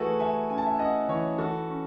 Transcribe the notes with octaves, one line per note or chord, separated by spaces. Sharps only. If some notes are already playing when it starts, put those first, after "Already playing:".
Already playing: E3 A3 E4 F#4 G#4 A4 B4
A3 E5 G#5
C#4 G#5
A5
E5 G#5
C#4 D#5 F#5
E3 C#5 E5
E3 F#4 A4
C#4